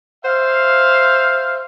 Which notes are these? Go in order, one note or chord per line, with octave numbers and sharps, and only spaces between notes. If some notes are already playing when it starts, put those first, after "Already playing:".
C5 E5 F5